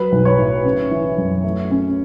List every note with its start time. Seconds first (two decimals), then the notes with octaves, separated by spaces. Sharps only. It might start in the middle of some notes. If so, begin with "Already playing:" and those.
Already playing: F#3 B4
0.12 B1
0.25 C#5
0.38 A2
0.65 C#3
0.91 E3
1.18 F#2
1.44 A3
1.71 C#4